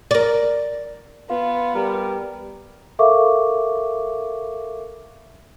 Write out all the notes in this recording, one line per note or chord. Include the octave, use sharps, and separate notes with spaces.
A#4 D5
B3 F4
G3 A#4
A4 A#4 E5 F5 C#6 D6